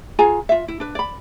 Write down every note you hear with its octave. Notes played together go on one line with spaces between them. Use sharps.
F4 G#4 G#5 A#5
F4 E5
E4
D4 B4
D5 B5